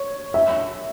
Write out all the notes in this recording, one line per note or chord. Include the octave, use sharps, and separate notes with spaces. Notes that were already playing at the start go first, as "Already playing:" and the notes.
Already playing: C#5
E5